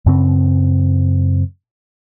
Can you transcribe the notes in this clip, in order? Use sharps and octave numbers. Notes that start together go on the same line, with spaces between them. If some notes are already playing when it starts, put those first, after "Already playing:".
F#2 C#3 C4